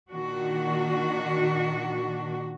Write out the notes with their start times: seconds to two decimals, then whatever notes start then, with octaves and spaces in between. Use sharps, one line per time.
0.12 A#2 D#3 D4 F#4